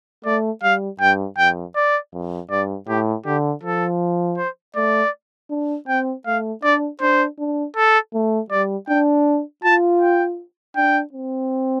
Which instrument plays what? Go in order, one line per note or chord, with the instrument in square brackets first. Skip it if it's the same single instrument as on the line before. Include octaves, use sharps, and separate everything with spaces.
[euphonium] A3 [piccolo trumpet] D5
[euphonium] G3 [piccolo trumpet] F5
[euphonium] G2 [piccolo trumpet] G5
[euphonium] F2 [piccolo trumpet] G5
[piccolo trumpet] D5
[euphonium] F2
[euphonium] G2 [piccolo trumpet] D5
[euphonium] A2 [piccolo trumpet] G4
[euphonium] D3 [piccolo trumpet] G4
[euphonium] F3 [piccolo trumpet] A4
[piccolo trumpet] C5
[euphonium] A3 [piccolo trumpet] D5
[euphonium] D4
[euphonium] C4 [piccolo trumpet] G5
[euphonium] A3 [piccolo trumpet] F5
[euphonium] D4 [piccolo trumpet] D5
[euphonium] D4 [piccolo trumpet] C5
[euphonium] D4
[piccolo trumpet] A4
[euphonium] A3
[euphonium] G3 [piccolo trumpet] D5
[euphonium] D4 [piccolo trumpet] G5
[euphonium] F4 [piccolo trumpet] A5
[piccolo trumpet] G5
[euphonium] D4 [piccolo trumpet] G5
[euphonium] C4